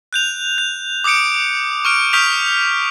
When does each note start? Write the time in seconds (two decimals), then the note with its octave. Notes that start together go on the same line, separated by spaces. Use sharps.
0.13 F#6 G6 F7
0.58 G6
1.04 D6 D#6 G6 C#7 D7
1.85 C#6 F6 D7
2.13 C#6 D#6 F6 G6 B6 F7